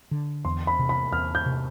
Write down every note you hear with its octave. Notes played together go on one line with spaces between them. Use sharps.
D3
E2 C6
B5
C3
B5
E2 F6
G6
C3